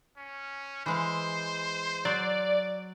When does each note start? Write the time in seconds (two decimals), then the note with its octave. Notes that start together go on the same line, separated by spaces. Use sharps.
0.18 C#4
0.86 E3 G#3 C5 F5
2.05 F#3 D5